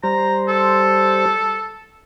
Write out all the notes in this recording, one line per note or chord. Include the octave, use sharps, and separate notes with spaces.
G3 C5 A#5
A4